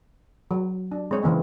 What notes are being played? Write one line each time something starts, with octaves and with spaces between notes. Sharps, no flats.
F#3
D4
G#3 C4 C#5
C#3 E3 A#3 C4